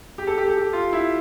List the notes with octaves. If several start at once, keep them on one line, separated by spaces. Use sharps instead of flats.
G4
A4
G4
A4
G4
F4
E4